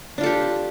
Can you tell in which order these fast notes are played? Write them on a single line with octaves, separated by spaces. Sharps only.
D4 F4 A4 G4